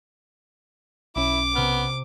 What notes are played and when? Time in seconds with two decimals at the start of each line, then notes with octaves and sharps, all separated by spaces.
1.16 B1 C#4 E4 D6
1.55 C3 B3 F6